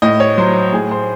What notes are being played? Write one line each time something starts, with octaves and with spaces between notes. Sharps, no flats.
A2 D#5
C#5
F#3 C5
A2 G#4
C5